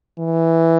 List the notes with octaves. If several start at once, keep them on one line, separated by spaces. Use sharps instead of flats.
E3